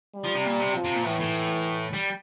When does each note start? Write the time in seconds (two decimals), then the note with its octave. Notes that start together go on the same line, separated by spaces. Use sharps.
0.15 G3
0.24 F3
0.34 C3
0.45 A#2
0.60 C3
0.74 F3
0.84 C3
0.94 A#2
1.04 A2 E3
1.19 A2
1.93 G3